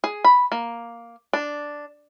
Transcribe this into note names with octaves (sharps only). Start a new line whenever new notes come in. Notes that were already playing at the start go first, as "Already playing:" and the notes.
G#4
B5
A#3
D4